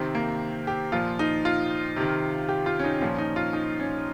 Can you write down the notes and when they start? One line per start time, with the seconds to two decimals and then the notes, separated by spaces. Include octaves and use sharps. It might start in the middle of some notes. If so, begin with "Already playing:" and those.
Already playing: C3 D#3 C4
0.15 A#3
0.67 G4
0.92 A#2 F3 F4
1.19 D#4
1.45 F4
1.96 C3 D#3
2.49 G4
2.66 F4
2.79 C#4
2.84 D#4
3.01 A#2 F3 C#4
3.18 D#4
3.36 F4
3.53 D#4
3.80 C#4